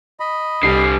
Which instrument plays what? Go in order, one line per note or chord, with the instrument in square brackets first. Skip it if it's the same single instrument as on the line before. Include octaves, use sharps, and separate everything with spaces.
[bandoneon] D#5 B5
[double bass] C2 [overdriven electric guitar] D3 G3 [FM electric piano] C7